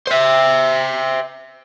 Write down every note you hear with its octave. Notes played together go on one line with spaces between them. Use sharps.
C5 E5